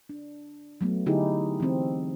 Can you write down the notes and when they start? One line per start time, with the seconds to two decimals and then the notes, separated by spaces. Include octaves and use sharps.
0.09 D4
0.81 F#3 A3 B3
1.06 D3 D#4 E4 G4 G#4
1.60 E3 C4